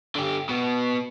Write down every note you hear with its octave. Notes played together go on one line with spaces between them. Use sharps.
D3 G4
B2 B3